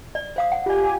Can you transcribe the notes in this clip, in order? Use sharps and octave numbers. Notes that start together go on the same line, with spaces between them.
D5
C5 F5 D#6
F#5
F4 G4 D5 G#5